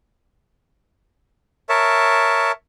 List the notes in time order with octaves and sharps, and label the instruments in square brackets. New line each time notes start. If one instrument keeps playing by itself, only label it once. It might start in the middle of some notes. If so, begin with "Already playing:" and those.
[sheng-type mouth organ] A#4 C#5 E5 A5